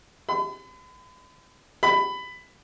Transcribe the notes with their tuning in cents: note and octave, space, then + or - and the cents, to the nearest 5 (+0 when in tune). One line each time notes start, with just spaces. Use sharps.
B5 +40
B5 +15